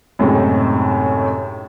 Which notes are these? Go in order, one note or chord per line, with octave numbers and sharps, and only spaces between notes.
F#2 A2 C3 G#3 D#4